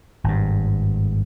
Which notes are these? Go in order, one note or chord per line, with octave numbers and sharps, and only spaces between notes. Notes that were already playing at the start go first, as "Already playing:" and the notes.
G#1 G2